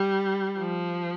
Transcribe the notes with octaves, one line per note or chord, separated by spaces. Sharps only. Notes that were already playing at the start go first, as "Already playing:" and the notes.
Already playing: G3
F3